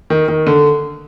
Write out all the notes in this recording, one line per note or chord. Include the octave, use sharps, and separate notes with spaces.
D#3
D#3
D3